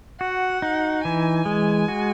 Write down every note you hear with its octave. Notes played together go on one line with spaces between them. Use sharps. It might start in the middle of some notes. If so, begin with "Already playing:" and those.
F#4 F#5
D#4
E3 G#5
G#3
F#4